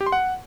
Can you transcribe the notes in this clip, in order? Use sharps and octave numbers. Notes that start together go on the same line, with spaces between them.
G4
C6
F#5